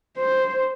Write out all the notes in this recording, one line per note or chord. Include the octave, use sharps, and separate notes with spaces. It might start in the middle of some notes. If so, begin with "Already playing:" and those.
C5